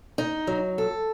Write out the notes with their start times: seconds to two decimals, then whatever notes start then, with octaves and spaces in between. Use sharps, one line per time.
0.18 D#4
0.47 F#3
0.78 A4